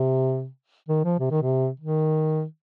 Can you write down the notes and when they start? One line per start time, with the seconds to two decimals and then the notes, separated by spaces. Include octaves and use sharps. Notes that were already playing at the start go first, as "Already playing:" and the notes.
Already playing: C3
0.89 D#3
1.04 F3
1.19 C3
1.31 D#3
1.42 C3
1.80 D#3